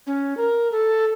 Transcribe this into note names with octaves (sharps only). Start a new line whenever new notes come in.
C#4
A#4
A4